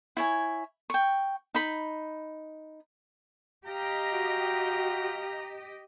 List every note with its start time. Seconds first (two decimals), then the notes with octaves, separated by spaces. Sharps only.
0.17 E4 C#5 G#5
0.90 G5 C#6
1.54 D#4 B5
3.65 G4 D#5 F5 G5 A#5
4.13 F#4